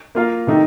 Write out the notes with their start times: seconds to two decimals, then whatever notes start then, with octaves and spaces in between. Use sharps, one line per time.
0.15 A#3 F4 A#4 F5
0.47 C3 D#3 A3 D#4